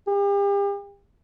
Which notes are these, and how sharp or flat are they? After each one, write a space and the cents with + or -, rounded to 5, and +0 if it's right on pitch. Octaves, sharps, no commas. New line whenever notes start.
G4 +40